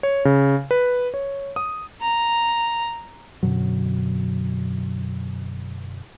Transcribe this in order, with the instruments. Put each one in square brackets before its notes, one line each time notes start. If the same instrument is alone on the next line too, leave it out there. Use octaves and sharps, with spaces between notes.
[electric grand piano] C#5
C#3
B4
C#5
D#6
[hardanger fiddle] A#5
[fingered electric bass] F#2 B2 D3 F#3